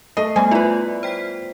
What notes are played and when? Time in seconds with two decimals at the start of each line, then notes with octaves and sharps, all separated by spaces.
0.17 A3 D#5 C7
0.36 G3 A3 B3 G#5
0.51 E4 F4 B4 D5
1.03 C5 G5 B6